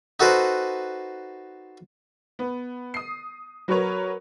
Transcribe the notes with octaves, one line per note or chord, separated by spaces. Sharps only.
D#4 F#4 A4 B4 C5
B3
D#6 C7
F#3 F#4 A#4 B4 C#5